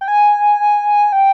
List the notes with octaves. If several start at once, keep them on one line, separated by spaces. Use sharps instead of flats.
G5
G#5
G5